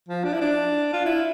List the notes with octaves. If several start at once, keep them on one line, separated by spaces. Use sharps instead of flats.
F3
D4
E4
D4
F4
E4